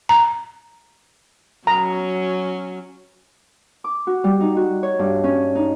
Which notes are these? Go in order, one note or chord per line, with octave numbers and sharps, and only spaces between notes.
A#5
F#3 C#4 A#5
D6
F#4
G3
D#4
F#4
C#5
G2
C#4
D#4